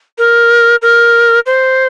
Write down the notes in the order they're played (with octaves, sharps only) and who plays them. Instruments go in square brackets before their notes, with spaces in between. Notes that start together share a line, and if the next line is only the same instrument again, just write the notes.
[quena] A#4
A#4
C5